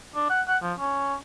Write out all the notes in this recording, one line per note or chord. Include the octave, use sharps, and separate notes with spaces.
D4
F#5
F#5
F3
C#4